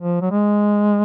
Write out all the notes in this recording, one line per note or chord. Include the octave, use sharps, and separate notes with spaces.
F3
F#3
G#3